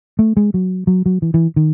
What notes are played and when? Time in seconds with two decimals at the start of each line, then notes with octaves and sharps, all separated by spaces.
0.19 A3
0.37 G#3
0.54 F#3
0.87 F#3
1.06 F#3
1.22 E3
1.34 E3
1.56 D#3